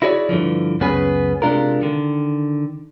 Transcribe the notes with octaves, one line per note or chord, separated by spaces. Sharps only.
E4 F#4 G#4 C#5 D5
G2 D3 E3 F3
C#2 F#2 B3 C#4 G#4 B4
C3 G#3 D4 F4 A#4
D3 D#3